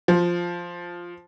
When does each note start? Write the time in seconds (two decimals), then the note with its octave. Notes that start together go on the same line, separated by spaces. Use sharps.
0.08 F3